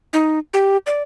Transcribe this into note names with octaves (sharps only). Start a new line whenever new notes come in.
D#4
G4
D5